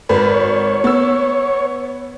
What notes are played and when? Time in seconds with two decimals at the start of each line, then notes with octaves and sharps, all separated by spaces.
0.09 G#1 B4
0.34 C#5
0.84 B3 E6